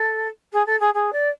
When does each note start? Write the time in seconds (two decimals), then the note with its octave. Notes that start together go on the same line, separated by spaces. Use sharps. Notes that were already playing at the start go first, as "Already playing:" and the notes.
Already playing: A4
0.52 G#4
0.66 A4
0.80 G#4
0.94 G#4
1.12 D5